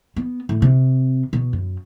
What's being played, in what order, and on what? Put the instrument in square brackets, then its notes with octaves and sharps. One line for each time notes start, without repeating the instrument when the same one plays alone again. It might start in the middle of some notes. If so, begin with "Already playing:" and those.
[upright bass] B3
A2
C3
B2
F#2